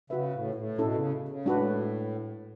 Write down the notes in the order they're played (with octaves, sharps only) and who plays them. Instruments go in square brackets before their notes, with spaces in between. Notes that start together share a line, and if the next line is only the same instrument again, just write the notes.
[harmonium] C#3 [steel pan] F#4 B4 E5
[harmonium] A2
A2
[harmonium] B2 [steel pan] C#4 E4 A4
[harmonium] C#3
C#3
[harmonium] A2 [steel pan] G#3 D4 F#4 B4